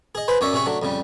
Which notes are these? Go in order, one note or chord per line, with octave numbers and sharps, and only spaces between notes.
G#4 D#5
G#4 B4 C5
F#2 C#4 C#5 D5 E5
C3 C#4 G#4 E5 C#6
F#3 A3 D4
F2 C#3 G3